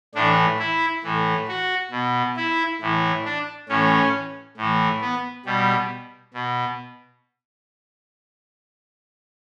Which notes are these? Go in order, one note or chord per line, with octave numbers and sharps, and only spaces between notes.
A2 E3 D4
E4
A2 E3
F#4
B2
E4
A2 E3
D4
A2 E3 C#4
A2 E3
B3
B2 G3
B2